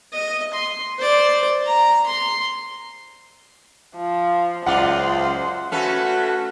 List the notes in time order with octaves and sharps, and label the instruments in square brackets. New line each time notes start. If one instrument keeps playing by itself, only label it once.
[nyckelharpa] D#5
C6
C5 D5
A#5
C6
[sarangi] F3
[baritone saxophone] C#2 [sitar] F#2 F4 D5 [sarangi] C5 [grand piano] F#5
[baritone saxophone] A3 [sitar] C#4 A4 B4 [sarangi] F#4